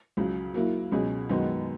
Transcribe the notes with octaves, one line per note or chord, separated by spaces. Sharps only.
C#2 C#3 F#3
F#3 A#3 E4
C#2 B2 F#3 C#4 G#4
F#2 D#3 G#3 B3 F#4